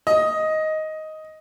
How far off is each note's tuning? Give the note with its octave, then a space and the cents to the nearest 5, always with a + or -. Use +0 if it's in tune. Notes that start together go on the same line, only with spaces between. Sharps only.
D#5 +5